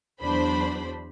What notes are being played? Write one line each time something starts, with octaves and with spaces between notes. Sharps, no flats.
E2 F#3 D4 C5 B5